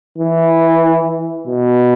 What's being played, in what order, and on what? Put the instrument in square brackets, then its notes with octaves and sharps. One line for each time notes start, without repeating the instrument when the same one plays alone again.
[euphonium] E3
B2